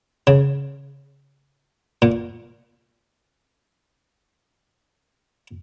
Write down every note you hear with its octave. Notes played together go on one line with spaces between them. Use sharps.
C#3
A#2